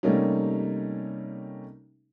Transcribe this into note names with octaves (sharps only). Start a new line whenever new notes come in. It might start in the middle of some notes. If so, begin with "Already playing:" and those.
C3 G3 A3 A#3 C#4 D#4